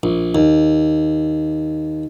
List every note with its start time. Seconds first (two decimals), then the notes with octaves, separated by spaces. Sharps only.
0.03 A#1
0.35 D#2